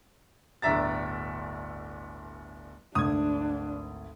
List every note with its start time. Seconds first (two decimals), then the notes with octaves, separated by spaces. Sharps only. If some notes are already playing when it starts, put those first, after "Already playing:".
0.62 D1 G1 D4 E5 A#5 A6
2.95 G#1 D2 D4 D#6 G#6